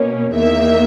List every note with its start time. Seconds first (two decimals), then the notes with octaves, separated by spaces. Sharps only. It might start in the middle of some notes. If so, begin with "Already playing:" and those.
Already playing: B2 A#3 C#4
0.34 E2 D#3 A#3 E5